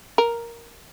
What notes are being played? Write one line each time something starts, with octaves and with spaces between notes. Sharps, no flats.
A#4